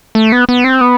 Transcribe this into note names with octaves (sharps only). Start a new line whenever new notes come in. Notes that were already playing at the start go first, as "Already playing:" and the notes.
A3
B3
B3
C4
B3